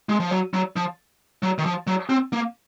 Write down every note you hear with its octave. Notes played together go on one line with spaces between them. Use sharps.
G#3
F3
F#3
F#3
F3
F#3
D#3
F3
F#3
C4
A#3